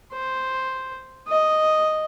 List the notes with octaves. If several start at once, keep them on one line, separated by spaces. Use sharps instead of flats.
C5
D#5